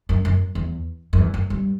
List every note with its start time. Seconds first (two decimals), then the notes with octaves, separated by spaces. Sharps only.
0.09 F#2
0.25 F#2
0.55 E2
1.13 F#2
1.18 E2
1.34 F#2
1.50 G2